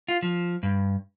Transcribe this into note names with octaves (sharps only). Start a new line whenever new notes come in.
F4
F3
G2